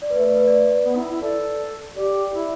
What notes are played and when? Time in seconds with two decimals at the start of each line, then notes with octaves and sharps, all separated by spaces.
0.02 D5
0.10 A3 B4
0.23 D5
0.35 B4
0.47 D5
0.85 B3
0.97 E4
1.11 E4
1.22 A4 D5
1.96 G4 D5
2.33 E4